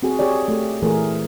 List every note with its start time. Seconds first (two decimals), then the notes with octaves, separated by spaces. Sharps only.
0.03 C4 F#4 G#4
0.19 G4 G#4 C#5 D5
0.48 A3 G4
0.82 A#2 E3 A3 G#4 A#4